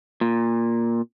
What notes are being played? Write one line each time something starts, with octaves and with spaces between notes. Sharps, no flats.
A#2